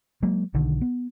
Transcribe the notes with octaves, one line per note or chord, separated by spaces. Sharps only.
F#3 G#3 A#3
B1 D3 D#3
B3